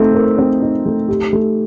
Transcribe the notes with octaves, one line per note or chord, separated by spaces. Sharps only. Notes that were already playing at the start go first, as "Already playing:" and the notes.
Already playing: A3 C4 D#4
A#4
C4
D#4
A3
G4
A3